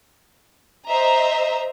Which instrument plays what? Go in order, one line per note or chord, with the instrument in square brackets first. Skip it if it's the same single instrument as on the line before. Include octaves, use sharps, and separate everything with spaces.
[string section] C5 D#5 E5 A#5